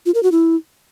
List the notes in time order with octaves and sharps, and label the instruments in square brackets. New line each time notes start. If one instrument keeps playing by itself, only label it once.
[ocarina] F4
A#4
F#4
E4